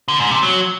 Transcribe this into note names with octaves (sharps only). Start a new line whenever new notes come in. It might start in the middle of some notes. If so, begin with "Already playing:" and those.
D3
G#2
C3
F#3